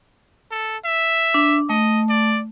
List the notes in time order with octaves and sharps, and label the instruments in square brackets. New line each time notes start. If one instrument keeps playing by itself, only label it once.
[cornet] A4
E5
[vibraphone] D4
[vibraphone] A3 [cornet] D#5
[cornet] D5